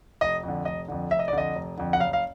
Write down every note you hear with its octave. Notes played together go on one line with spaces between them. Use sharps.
F1 D#5
F2 D3
F1 D#5
F2 D3
F1 E5
D#5
D5
F2 D3 D#5
F1
F2 D3
F#5
F#1 F5
F5